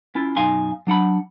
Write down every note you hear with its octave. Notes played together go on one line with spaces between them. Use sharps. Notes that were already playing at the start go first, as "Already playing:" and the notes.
C#4 E4 F4
F#2 B2 D#4 F5 G#5 C6
F#3 D4 F#5 B5